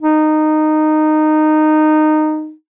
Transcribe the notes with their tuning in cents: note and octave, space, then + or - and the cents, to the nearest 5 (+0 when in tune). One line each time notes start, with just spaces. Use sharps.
D#4 -15